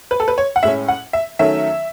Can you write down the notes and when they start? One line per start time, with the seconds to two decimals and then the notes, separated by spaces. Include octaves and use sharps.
0.11 B4
0.20 A4
0.28 B4
0.38 C#5
0.56 F#5
0.63 A2 G#3 C#4 E5
0.88 F#5
1.13 E5
1.39 D#3 F#3 A3 C#4 E5